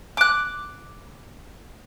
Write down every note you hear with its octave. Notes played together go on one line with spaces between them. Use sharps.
D6 F#6